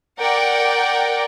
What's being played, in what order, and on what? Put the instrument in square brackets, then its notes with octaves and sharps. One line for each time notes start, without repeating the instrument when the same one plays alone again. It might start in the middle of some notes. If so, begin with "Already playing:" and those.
[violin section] A#4 D5 F#5 G5